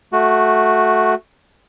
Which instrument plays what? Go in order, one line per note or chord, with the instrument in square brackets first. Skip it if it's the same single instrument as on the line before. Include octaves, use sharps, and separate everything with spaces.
[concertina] A3 F#4